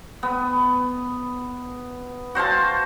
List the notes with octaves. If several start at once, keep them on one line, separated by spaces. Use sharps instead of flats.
B3
F#4 C5 F5 A5